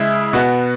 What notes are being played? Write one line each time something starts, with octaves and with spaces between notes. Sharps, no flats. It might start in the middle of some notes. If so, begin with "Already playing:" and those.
Already playing: C#3 G#3 E4
B2 B3 F#4